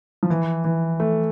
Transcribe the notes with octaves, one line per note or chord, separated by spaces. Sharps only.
F3
E3
E3
A3